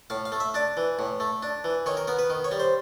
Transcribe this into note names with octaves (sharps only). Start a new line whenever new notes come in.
A2 F5
F5
A3
E5
D4 D5
E3
A2
A3
D4
E3
D#3 C#5
A#4
B3 A#4
B4
D#3
C#5
G3
C5